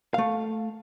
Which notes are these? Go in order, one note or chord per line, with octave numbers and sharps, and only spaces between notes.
A3 F5